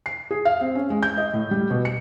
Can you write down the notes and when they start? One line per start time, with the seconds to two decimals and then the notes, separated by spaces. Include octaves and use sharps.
0.06 C7
0.31 G#4
0.45 F5
0.61 C4
0.75 C#4
0.90 G#3
1.03 G6
1.17 D#5
1.33 A2
1.51 G3
1.71 B2
1.85 C#7